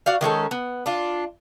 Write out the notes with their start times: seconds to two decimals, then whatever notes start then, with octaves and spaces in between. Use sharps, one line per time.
0.06 F#4 D5 F5
0.21 D#3 G#3 C#4 A4
0.51 B3
0.86 D4 F4